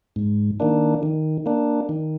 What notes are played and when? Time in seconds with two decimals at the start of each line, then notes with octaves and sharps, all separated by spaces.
0.16 G#2
0.60 D#3 A#3 D4
1.03 D#3
1.46 A#3 D4
1.89 D#3